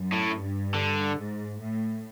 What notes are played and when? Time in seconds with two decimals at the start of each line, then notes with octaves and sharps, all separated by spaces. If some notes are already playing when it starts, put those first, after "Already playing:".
Already playing: F#2
0.13 A2
0.33 G2
0.74 D3
1.16 G#2
1.57 A2